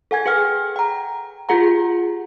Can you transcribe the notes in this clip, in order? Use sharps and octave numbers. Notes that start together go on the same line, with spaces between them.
A4 F#5 G#5 G#6
G#4 B4 F#5 G5 F6
G5 A#5
F4 G4 G#4 F#5 A#5